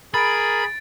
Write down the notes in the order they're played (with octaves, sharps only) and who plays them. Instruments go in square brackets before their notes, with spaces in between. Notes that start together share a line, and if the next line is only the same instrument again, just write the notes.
[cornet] G#4 [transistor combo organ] A#4 [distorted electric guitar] B5 [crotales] A6 D7